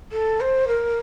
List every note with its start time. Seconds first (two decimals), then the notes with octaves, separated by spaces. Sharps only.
0.12 A4
0.41 C5
0.68 A#4